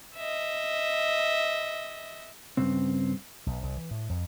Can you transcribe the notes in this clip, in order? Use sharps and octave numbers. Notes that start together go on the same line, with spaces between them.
D#5 E5
G2 C#3 C4
B1
C2
E3
A2
F2